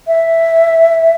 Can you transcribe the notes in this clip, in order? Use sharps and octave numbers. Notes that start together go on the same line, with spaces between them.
E5